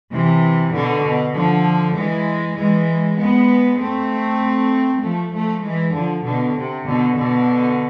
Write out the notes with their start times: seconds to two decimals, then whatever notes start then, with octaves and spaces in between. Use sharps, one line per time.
0.12 C3 E3
0.73 B2 D3
1.04 B2
1.35 D3 F3
1.96 E3 G#3
2.57 E3 G#3
3.18 G#3 B3
3.79 A3 C4
5.02 F3 A3
5.33 F3 A3
5.63 E3 G#3
5.94 D3 F3
6.25 B2 D3
6.56 C3
6.86 B2 D3
7.16 B2 D3